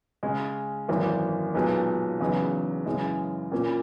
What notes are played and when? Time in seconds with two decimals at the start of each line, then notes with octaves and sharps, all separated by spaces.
0.23 C#3 G#3 C#4
0.89 G#1 F#2 E3 A#3
1.54 B1 A#2 G#3 B3 D#4
2.21 E2 C#3 F#3 B3 D#4
2.86 F#2 C#3 E3 G#3
3.52 A#2 A#3 C#4